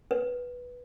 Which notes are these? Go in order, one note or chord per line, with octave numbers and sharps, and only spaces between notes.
B4